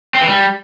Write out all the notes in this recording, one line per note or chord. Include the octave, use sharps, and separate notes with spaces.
C4
E3
G3